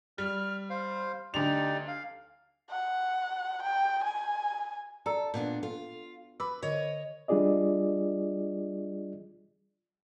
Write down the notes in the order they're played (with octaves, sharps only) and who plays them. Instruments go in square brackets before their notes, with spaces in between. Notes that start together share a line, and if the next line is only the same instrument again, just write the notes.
[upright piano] G3 [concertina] F6
[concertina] C5 F5
[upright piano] D2 F7 [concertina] D#4 G4 D5
[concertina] F5
[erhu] F#5
G5
G#5
[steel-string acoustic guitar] A4 [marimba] D5 A#5 E6
[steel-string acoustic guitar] A#2 B3 D4
[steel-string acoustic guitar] F4 [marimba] A4
[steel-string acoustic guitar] B4 [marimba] B5 D6 E6
[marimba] D3 A#4 [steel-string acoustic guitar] C#5 D#5
[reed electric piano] G3 D4 F4 G#4 D5 D#5